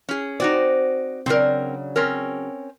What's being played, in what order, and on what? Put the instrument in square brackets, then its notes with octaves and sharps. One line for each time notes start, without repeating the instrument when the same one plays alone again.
[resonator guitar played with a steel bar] C#4 G#4
[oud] C4 [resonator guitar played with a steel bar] D#4 F#4 D5
[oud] C#3 F#3 D4 [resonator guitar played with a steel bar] C4 A#4
[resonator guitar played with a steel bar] C4 C#4 A#4